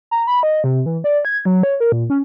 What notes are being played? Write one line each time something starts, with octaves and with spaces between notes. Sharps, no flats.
A#5
B5
D#5
C3
E3
D5
G#6
F#3
C#5
A#4
A#2
C#4